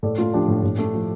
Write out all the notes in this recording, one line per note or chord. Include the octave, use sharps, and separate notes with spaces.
A2 A4 D5
A3 F4 A4
F3 D4 G4
A2
A2
A3
F3